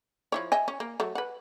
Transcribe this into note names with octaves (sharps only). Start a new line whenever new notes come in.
F3 E4 C#5
D#5 E5 G#5
C#4
A#3
F#3 A3
B4 F#5